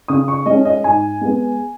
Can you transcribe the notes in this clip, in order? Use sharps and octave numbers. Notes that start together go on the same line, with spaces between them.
C#3 D#6
C#6
G#3 C#4 D#5
D#5
G#2 G#5
G#3 B3